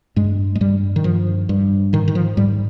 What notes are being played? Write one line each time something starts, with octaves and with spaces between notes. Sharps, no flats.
G2 G#3
G#3
G2 G3
D#3
G2 F3
G2
G#2 D#3
D#3
F3
G#2 G3